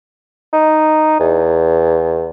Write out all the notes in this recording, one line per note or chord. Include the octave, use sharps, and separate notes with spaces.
D#4
E2